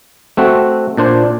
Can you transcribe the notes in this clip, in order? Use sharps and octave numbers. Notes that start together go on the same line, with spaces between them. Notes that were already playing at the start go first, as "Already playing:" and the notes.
A3 C4 F#4
A#2 D4 C5